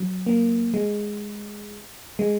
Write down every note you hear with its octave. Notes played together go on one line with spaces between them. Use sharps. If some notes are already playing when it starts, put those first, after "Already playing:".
Already playing: F#3
A#3
G#3
G#3